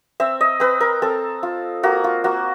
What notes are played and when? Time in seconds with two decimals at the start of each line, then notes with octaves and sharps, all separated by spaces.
0.20 C4 E5
0.41 D#5
0.60 C4 B4
0.81 A#4
1.02 C4 A4
1.43 F4
1.83 A#3 F#4
2.04 F4
2.24 A#3 F#4